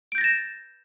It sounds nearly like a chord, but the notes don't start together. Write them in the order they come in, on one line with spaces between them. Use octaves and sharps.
D7 G6 A#6 A6 E7